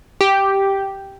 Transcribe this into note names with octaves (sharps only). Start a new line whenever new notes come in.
G4